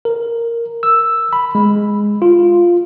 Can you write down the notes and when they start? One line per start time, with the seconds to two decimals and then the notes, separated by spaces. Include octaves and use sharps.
0.05 A#4
0.83 E6
1.33 B5
1.55 G#3
2.22 F4